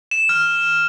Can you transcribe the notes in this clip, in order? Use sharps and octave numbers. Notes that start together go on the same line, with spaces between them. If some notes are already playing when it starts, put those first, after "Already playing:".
E7
F6